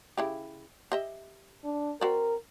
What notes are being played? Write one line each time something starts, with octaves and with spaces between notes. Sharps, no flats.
C#3 E4 G4
G4 D#5 E5
D4
C4 F#4 A#4 D5